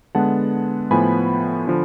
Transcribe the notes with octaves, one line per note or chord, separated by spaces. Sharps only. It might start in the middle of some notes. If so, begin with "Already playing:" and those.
D3 G#3 B3 F#5 A5
A2 F3 B3 G#5 B5
D3 F3